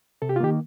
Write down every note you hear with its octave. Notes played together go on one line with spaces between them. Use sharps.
C3 A4
G4
F4
D#3 A#3 G4